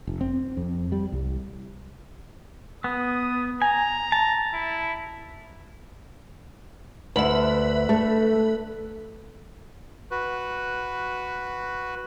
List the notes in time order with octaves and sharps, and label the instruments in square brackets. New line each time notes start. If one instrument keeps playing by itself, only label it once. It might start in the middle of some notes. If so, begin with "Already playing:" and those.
[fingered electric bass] F1
C4
F2
G3
C2
[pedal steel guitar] B3 [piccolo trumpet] D#6
[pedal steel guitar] G#5 [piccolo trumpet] A#5
[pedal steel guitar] A5
[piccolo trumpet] E4
[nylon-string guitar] D2 [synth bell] B4 E5
[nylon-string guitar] A3
[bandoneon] F#4 B4